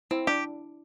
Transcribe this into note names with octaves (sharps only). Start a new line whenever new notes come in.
C4 E4
D4 G4